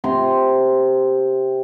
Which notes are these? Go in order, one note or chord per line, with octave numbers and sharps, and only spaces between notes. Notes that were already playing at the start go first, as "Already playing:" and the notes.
C3 G5 A#5 C6